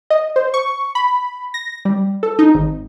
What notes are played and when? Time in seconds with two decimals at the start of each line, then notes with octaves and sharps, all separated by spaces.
0.10 D#5
0.36 C5
0.54 C#6
0.95 B5
1.54 A#6
1.85 G3
2.23 A4
2.39 D#4
2.55 G#1